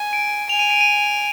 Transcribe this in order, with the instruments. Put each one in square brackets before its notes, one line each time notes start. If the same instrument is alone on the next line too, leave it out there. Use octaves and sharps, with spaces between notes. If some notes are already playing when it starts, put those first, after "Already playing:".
Already playing: [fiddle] G#5
[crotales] D7
[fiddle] G#5 [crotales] F7
[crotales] D#7
D7
D#7